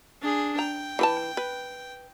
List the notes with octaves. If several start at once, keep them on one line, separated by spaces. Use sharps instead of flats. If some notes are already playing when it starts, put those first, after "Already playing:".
D4 G#4
G5 A#5
E3 B4 A5
B4